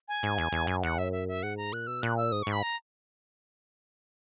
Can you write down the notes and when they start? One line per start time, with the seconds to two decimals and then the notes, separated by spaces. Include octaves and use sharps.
0.08 G#5
0.23 G#2
0.38 E2
0.52 E2
0.67 F#2
0.83 E2 F#5
0.98 F#2 E5
1.12 E5
1.28 E5
1.43 G#2 F#5
1.57 A#5
1.73 A#2 F#6
1.87 B2 E6
2.02 A#2 F#6
2.17 E6
2.32 G#2 D#6
2.43 C#6
2.47 G#2
2.52 B5
2.63 A#5